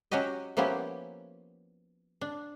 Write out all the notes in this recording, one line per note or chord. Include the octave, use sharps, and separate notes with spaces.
F#3 C#4 F#4 G4 D#5
F3 A#3 B3 C#4 E4 G4
D4